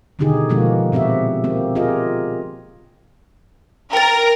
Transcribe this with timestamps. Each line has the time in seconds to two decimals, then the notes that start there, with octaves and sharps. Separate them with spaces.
0.19 B2 D3 D#3 D#4 G4 G#4
0.49 B2 F3 G#3 A#3 B3 F#4
0.92 A#2 C4 F#4 G4 E5
1.44 A#3 C4 G4
1.75 F4 G4 G#4 A#4 D#5
3.93 A#4 G5 A6